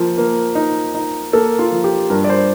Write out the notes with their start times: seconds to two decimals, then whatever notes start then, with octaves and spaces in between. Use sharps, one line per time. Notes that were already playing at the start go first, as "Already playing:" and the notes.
Already playing: F3 A#3
0.18 A#3
0.55 D#4
0.95 D#4
1.33 A#3 A4
1.59 F4
1.71 F3
1.84 G4
2.10 G2 A#4
2.24 D5
2.29 C5